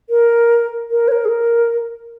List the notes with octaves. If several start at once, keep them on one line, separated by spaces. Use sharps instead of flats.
A#4
A#4
C#5
A#4
G#4
A#4